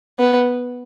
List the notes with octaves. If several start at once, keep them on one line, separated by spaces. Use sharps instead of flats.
B3